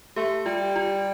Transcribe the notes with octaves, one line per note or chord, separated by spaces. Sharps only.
A3 G4
G3 F4
F4